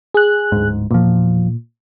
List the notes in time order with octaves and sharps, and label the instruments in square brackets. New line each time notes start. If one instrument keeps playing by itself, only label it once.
[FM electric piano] G#4 F#6
[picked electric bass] D1 G#2
[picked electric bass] E1 F3 [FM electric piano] A#2